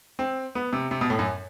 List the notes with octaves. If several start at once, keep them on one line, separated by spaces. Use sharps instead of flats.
C4
B3
C3
C3
B2
A2
F#2